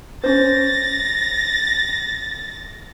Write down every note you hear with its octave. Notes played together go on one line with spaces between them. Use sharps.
C#4 D4 C5 A6 A#6